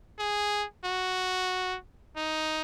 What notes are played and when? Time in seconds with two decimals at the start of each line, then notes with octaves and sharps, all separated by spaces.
0.19 G#4
0.85 F#4
2.17 D#4